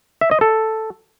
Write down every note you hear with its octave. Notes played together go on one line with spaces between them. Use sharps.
E5
D#5
A4